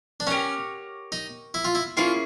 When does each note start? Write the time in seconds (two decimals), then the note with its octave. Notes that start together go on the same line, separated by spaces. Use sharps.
0.20 D4
0.27 C#4 G4 A#4 C#5 F#5
1.12 D#4
1.54 E4
1.65 F4
1.75 E4
1.97 A#3 C#4 E4 F4 G#4